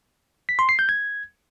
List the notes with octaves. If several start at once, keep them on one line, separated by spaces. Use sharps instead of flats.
B6
C6
C7
G6
G#6